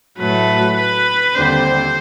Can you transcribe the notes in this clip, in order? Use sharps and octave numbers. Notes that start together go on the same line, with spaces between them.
A2 F#3 A3 B4
B4
D#2 D3 G3 C4 C5